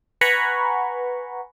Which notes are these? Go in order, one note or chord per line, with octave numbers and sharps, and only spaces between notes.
B4 F#5 G#5 A#5 B5 C#6